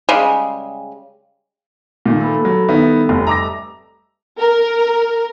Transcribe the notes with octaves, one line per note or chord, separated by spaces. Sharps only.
C#3 G3 G#3
A#2 D#3 A3
A4 B4
F#3
D#3 G3 B3 E4
F1
D#5 E5 A5 A#5 D6 A#6
A#4